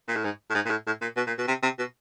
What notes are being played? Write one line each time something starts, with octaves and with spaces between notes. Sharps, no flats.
A#2
A2
G#2
A2
G#2
A#2
A2
A2
A#2
B2
A#2
B2
C3
C3
B2